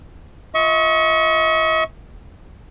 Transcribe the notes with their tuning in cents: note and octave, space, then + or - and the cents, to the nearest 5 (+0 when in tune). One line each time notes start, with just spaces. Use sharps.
F4 -20 D#5 +45 C#6 +0